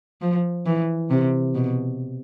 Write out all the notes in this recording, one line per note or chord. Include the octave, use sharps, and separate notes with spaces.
F3
E3
C3
B2